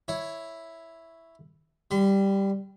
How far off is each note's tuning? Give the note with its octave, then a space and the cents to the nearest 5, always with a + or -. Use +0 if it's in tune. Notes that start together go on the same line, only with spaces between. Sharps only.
E4 +0 C#5 +0
G3 +0 B5 +45